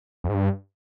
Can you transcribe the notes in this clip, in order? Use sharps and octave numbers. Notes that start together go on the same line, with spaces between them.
F2
G#2
G2